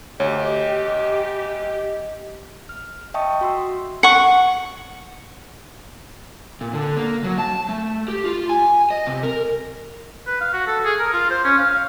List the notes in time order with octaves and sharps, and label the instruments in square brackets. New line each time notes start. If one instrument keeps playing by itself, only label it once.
[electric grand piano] D2 [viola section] G4 [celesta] C#5 [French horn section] D#5
[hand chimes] F6
D#5 E5 G5 A5 C#6 D#6
F#4 C6 E6
[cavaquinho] F#5 C#6
[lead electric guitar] A#2
D3
A#3
F#3
A5
A3
G4
F4
G#5
D#5
C3
A#4
[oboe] B4
F5
F#4
A4
G#4
A#4
F4
C5
C#4
F5
F5